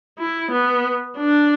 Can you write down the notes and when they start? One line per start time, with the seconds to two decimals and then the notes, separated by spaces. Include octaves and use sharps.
0.19 E4
0.52 B3
1.18 D4